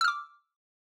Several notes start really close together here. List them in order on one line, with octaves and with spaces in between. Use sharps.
E6 F6 D6